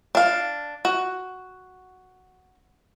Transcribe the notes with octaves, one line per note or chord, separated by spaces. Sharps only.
D4 F5
F#4